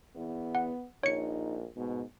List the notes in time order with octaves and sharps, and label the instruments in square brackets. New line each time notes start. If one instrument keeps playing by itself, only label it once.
[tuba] E2 [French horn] B3
[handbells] F#5
[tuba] A#1 [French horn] D#4 [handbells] C#5 C#7
[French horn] G#2 [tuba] B2